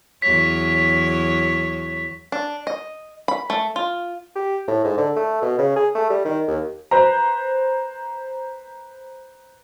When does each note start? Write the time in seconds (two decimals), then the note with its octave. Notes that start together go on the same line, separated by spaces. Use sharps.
0.22 E2 F#3 C#5 B6
2.32 D4
2.67 D#5
3.28 B5
3.50 A3
3.76 F4
4.35 G4
4.68 A2
4.85 G#2
4.98 D3
5.16 A3
5.42 B2
5.59 C#3
5.76 G#4
5.95 A3
6.10 G3
6.25 D#3
6.47 D#2
6.91 B4 C5 A#5